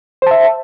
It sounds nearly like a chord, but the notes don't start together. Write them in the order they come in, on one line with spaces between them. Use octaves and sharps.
C5 A5 E5